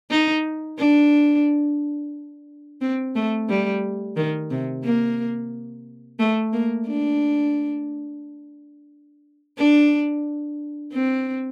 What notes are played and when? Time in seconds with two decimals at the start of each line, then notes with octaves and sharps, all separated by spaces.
0.11 D#4
0.79 D4
2.81 C4
3.15 A3
3.49 G3
4.16 D#3
4.51 C3
4.84 A#3
6.19 A3
6.53 A#3
6.87 D4
9.58 D4
10.93 C4